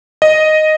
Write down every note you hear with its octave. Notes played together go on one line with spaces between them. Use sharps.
D#5